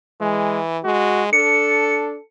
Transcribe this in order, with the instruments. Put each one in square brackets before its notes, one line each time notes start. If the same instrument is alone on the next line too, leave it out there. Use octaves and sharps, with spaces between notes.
[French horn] E3 [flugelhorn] G#3
[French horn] G#3 [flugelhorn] F#4
[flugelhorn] D4 [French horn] A4 [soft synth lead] C#7